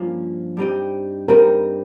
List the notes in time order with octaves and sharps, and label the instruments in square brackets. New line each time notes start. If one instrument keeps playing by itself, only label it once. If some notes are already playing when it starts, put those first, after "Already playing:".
Already playing: [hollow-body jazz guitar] G2 F3 A#3 C#4
G2 G3 C4 D#4 G4
[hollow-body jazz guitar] G2 G3 C4 D#4 G4 [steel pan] A#4